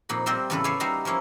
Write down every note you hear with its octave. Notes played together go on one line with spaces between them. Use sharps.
F2 A#2 D#4 B5
G3 C4 F4 A#4 C5 E5
E2 A2 C#3 A4 B4
A4 C#5 D5 E5 F5 G#5
G3 D#4 F#4 C#5 E5 F5
F3 A#3 C#4 E4